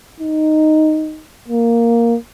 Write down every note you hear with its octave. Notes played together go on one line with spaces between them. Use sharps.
D#4
A#3